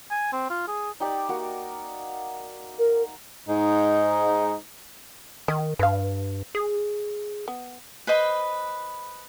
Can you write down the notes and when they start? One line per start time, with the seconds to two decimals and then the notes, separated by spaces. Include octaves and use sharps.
0.11 G#5
0.33 C4
0.50 F4
0.68 G#4
1.00 D#4 G4 D5
1.29 A#3 F#4
2.79 A#4
3.48 G#2 D#4
5.48 D#3 D#5
5.79 G2 B4 F5
6.55 G#4
7.48 B3
8.07 B4 C5 D#5 B5